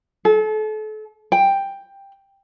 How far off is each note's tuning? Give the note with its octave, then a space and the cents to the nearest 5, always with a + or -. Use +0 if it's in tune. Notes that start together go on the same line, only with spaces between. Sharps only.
A4 -35
G5 +10